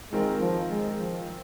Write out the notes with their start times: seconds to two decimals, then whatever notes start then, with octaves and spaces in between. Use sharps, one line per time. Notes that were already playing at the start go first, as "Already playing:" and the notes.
0.12 D#3 G#3 C4 F4 A#4
0.41 F3
0.71 G#3
0.99 F3